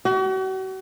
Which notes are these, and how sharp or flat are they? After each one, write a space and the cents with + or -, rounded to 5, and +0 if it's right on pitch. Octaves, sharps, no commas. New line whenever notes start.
F#4 +40